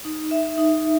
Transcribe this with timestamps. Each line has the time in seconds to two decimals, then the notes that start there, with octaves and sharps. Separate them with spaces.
0.05 D#4
0.31 E5
0.58 D#4